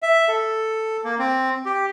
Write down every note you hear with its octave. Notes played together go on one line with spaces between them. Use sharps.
E5
A4
A#3
C4
G4